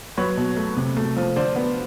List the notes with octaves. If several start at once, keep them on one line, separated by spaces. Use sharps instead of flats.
F#3 B4 C#5
B2
A3
C3
A3
F3
D3 C5 D5
B3